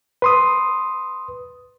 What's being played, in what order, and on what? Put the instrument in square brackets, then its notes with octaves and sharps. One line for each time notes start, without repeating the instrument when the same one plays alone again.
[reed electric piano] B4 C6 D#6